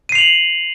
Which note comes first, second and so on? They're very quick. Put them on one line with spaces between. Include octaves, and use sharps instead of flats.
D#7 C7 F7 F#7